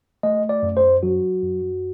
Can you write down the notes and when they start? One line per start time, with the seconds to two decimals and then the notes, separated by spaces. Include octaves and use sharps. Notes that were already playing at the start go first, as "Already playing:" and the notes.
0.23 A3 D#5
0.49 D5
0.63 F#2
0.77 C5
1.03 F#3 F#4
1.43 F#2